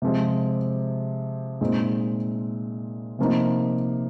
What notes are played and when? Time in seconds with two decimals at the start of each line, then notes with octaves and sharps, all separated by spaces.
0.02 C3 F3 G#3
1.61 A#2 G#3 C4 D#4
3.19 C3 F3 A#3 D#4